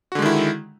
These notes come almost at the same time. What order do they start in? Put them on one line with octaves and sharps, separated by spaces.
F#4 D3 G#3 D#3 E4